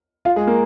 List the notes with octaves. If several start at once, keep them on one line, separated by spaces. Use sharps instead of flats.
F4 F5
G#3 G#4
A#3 A#4